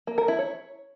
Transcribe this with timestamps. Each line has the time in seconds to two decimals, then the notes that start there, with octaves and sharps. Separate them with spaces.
0.07 A#3
0.18 A#4
0.28 E4
0.39 C#5